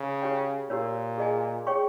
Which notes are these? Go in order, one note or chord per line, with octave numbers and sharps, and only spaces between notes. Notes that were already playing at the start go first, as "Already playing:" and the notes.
Already playing: C#3
G4 C#5 G5
A#2 G4 A#4 C#5
G#4 D#5 G#5
G#4 C#5 G5 C#6